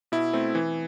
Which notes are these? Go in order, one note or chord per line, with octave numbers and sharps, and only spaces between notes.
B2 E4
A3 C4
E3